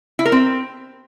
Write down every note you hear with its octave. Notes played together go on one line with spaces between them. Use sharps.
E4
A#4
C4